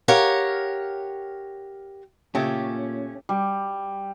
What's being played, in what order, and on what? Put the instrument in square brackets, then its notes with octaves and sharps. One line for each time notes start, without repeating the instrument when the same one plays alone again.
[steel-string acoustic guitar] G4 A#4 C#5 F5 F#5
[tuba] A#2 [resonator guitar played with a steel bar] C#3 A3 G4 [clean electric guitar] C#4
[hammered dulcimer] G3